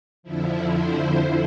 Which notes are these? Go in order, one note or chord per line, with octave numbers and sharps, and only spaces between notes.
F2 D3 F3 E4
C5